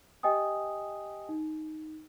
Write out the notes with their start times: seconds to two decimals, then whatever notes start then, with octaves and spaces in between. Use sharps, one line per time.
0.23 G4 D#5 G5 G#5 D#6
1.29 D#4